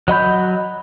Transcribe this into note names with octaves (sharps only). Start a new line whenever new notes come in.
F#3 D#5 B5 G6